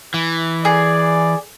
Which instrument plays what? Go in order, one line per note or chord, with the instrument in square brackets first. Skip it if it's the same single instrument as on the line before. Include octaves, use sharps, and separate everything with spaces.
[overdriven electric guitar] E3
[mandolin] G#4 [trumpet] D5